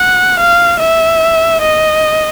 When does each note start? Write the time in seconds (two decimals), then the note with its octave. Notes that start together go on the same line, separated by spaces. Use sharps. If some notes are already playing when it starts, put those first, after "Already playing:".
Already playing: F#5
0.40 F5
0.80 E5
1.62 D#5